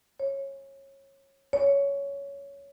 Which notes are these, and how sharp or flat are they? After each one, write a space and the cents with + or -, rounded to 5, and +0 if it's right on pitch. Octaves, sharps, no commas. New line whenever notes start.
C#5 -20
C#5 +15